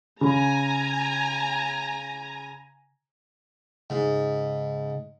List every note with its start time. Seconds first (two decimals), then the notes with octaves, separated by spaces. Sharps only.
0.21 C#3 G#5 A#5 B5
3.90 G#2 C#3